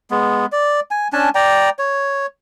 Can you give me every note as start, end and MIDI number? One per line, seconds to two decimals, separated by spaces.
0.11 0.46 56
0.11 0.46 59
0.52 0.80 74
0.91 1.08 80
1.13 1.29 61
1.13 1.29 62
1.13 1.29 80
1.13 1.29 81
1.35 1.70 74
1.35 1.70 79
1.35 1.70 82
1.79 2.26 73